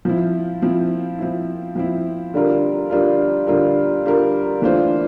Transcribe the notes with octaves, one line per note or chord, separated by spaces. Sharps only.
F3 C4 E4
F3 C4 E4
F3 C4 E4
F3 C4 E4
D3 G3 D4 F4 A#4
D3 G3 D4 F4 A#4
D3 G3 D4 F4 A#4
D3 G3 D4 F4 A#4
E3 A3 D4 F4 C5